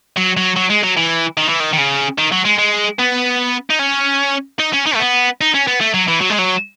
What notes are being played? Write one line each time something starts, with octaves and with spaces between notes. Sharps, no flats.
F#3
F#3
F#3
G#3
F#3
E3
D#3
E3
D#3
D#3
C#3
D#3
F#3
G#3
G#3
B3
D#4
C#4
D#4
C#4
D#4
A3
B3
D#4
C#4
B3
A3
F#3
E3
F#3
G#3
F#3